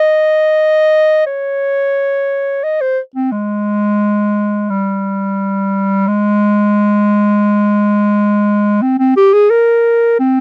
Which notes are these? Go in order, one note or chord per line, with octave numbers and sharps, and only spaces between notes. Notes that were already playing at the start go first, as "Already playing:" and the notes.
Already playing: D#5
C#5
D#5
C5
C4
G#3
G3
G#3
C4
C4
G4
G#4
A#4
C4